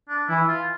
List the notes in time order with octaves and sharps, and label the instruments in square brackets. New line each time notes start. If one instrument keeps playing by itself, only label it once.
[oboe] D4
[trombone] E3 [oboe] E4
[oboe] F4